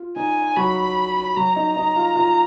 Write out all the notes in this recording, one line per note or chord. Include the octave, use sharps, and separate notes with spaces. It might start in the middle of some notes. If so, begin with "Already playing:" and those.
Already playing: F4
D#4 G#5
F#3 F#4 B5
F#3 F#4 A#5
D#4 D#5
D#4 D#5
F4 F5
F4 F5